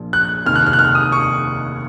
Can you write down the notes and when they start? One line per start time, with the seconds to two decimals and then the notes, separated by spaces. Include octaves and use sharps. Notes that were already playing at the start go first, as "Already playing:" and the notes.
Already playing: A#1 A#2 F3
0.13 F#6
0.45 F1 D#2 D#3 F6
0.56 F#6
0.66 F6
0.73 F#6
0.79 F6
0.95 D#6
1.12 C#6